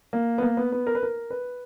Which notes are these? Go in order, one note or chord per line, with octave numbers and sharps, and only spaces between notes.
A#3
B3
A#3
B3
B3
A#4
B4
A#4
B4